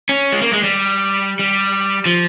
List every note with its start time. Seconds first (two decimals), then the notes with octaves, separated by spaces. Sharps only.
0.09 C#4
0.32 G#3
0.42 A#3
0.53 G#3
0.63 G3
1.39 G3
2.06 F3